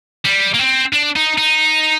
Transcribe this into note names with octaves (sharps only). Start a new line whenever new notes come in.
G3
A#3
C4
D4
D#4
D#4